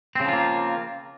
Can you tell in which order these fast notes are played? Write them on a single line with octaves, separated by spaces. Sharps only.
C4 C#3 F3 F4 A#3